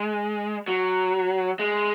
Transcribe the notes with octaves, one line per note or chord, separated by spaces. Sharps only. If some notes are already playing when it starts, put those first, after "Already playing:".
Already playing: G#3
F#3
G#3